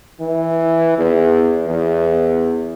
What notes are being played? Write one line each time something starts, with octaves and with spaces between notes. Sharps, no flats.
E3
E2
E2